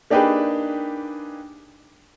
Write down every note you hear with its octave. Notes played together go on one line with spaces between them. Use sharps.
A#3 D4 D#4 G4 G#4 B4